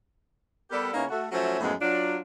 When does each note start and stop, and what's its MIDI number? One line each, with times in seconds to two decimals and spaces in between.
0.71 0.89 55
0.71 0.89 59
0.71 0.89 67
0.71 0.89 69
0.71 0.89 70
0.71 0.89 74
0.94 1.04 49
0.94 1.04 58
0.94 1.04 59
0.94 1.04 61
0.94 1.04 63
0.94 1.04 64
1.10 1.24 57
1.10 1.24 66
1.30 1.57 53
1.30 1.57 54
1.30 1.57 57
1.30 1.57 61
1.30 1.57 69
1.30 1.57 76
1.60 1.72 42
1.60 1.72 45
1.60 1.72 53
1.60 1.72 56
1.60 1.72 59
1.80 2.17 54
1.80 2.17 62
1.80 2.17 65